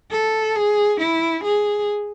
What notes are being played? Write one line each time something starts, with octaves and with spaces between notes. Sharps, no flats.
A4
G#4
E4
G#4